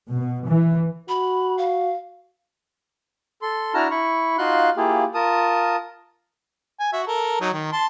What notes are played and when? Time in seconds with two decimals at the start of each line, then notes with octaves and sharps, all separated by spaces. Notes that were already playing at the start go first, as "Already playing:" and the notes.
0.11 B2
0.48 E3
1.09 F#4 B5
1.58 F5
3.42 A4 C6
3.74 D4 E4 F#4 A5 A#5 F6
3.91 E4 B5 C#6
4.38 D#4 F4 F#4 F5 C6 F#6
4.77 A#3 E4 F4 G4 G#4
5.14 F4 A#4 A5 D#6
6.80 G#5
6.93 F#4 E5
7.07 A4 A#4
7.41 F#3 D#4
7.53 D#3
7.72 A5 C6